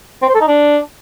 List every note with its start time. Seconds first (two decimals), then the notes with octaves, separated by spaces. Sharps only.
0.22 C4
0.28 C5
0.35 A4
0.41 D#4
0.48 D4